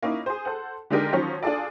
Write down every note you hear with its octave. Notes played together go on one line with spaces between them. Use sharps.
A#3 C#4 D#4 E4
G#4 C5
A4 C5 F#5
D3 G#3 D4 D#4 G4 A#4
D#3 F3 F#3 C#4
D4 F4 G#4 A4 D5